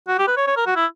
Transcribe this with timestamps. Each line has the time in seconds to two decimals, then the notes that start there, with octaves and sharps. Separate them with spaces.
0.08 F#4
0.18 G4
0.28 B4
0.37 C#5
0.47 C#5
0.57 A#4
0.66 F#4
0.76 E4